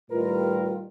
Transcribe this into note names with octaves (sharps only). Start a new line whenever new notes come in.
A2 D#3 G3 F4 A#4 B4